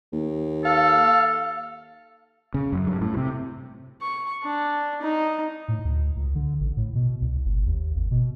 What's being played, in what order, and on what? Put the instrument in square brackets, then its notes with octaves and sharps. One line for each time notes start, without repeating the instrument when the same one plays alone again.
[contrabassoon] D#2
[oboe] A4 [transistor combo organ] F5
[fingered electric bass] C#3
F#2
G2
A2
C3
[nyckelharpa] C#6
D4
D#4
[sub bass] A2
D2
C#2
D3
A1
A2
B2
C2
G1
D#2
G#1
B2